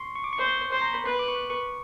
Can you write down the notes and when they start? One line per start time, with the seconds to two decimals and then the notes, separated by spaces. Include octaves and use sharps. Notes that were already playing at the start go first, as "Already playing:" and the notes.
Already playing: C6 C#6
0.15 C#6
0.24 D6
0.33 C#6
0.39 C5
0.72 C5
0.81 A#5
0.93 B5
1.05 B4 C6
1.19 D6
1.28 C#6
1.50 C#6